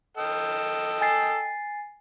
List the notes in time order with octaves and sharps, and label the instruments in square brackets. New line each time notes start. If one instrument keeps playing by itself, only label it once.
[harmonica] A4 D#5 G5
[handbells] G#5 A6 C7